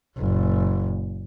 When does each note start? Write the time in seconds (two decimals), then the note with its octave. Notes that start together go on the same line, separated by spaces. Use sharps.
0.17 F#1 A#2